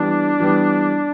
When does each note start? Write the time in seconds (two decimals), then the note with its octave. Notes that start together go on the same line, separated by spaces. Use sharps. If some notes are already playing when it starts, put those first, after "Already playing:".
Already playing: E3 G3 B3 D4
0.40 E3 G3 B3